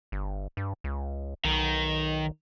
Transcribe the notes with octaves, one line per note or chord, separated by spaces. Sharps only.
G1
G2
C#2
B1 D#3